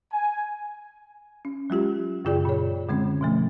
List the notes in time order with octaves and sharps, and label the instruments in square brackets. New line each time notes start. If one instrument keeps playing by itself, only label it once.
[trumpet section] G#5
[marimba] C#4
F#3 G#3 F4 G4
F#2 C#3 F4 G#4 D5 G5
A#2 C#5
D3 G#3 C4 C#4
B2 F3 A3